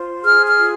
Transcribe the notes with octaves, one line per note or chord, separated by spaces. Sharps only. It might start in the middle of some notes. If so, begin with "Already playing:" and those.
Already playing: F4 C5
G#4 F6
F6
F4